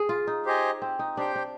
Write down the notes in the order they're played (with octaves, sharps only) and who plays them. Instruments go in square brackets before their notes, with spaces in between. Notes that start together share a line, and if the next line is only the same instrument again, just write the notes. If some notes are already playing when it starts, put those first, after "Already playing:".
Already playing: [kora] G#4
F4
D#4
[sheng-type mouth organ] G4 C5 D#5 G#5
[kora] C4
D#4
[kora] D4 [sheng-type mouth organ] G4 C5 G5
[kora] D4